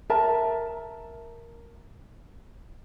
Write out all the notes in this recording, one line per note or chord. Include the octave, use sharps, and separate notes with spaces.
A#4 E5 A5 A#5